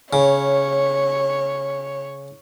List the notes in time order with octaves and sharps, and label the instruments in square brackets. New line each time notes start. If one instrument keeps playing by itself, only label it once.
[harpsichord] C#3 [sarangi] C#5